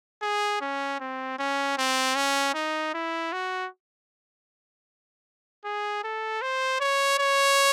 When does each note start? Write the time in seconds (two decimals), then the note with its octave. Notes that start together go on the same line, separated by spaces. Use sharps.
0.22 G#4
0.61 C#4
1.00 C4
1.39 C#4
1.78 C4
2.16 C#4
2.54 D#4
2.94 E4
3.33 F#4
5.65 G#4
6.04 A4
6.42 C5
6.80 C#5
7.19 C#5